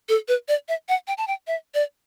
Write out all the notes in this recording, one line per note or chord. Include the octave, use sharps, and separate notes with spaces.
A4
B4
D5
E5
F#5
G5
A5
G5
E5
D5